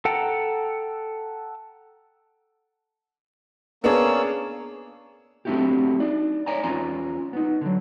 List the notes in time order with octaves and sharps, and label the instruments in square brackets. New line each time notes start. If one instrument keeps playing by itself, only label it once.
[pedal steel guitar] A4 F#5 G5 A5 A#5
[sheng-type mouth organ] A#3 C#4 E6 [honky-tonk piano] B3 D4 G#4
[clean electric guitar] A3 C4 D4 E4 F#4 G4
D#4 D5
C#5 D5 G#5 A#5
E2 C#4 F4 G#5 A#5
B3 D#4
D3 F#3